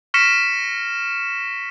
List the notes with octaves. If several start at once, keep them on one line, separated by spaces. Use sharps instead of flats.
C#6 F6 A#6 B6 C#7 E7